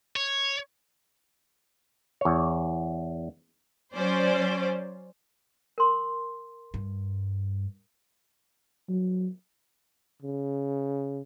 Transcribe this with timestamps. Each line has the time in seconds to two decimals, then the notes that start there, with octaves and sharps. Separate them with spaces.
0.16 C#5
2.21 E2 C#5
3.94 F#3 C#4 C5 D5
5.78 A#4 C6
6.74 G2
8.89 F#3
10.22 C#3